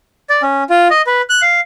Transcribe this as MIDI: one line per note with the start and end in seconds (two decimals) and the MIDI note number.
0.30 0.42 74
0.43 0.63 61
0.70 0.88 65
0.90 1.02 75
1.07 1.22 71
1.29 1.41 90
1.42 1.60 77